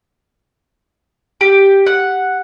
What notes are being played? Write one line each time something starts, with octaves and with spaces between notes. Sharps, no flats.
G4
F#5